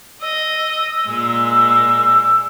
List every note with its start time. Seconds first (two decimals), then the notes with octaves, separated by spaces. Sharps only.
0.21 D#5 E6
1.05 A#2 G#3